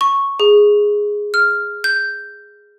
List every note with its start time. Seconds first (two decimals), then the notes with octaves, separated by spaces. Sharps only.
0.01 C#6
0.40 G#4
1.34 F6
1.84 G6